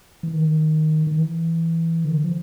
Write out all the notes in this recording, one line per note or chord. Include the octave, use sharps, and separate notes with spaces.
E3
D#3
D#3
E3
D3
F3